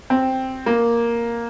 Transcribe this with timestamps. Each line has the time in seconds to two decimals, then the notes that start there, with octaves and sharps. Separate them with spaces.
0.10 C4
0.66 A#3